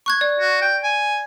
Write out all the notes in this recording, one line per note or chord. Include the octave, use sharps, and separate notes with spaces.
C#6 F#6 G#6
D5
F#4
G5
G#5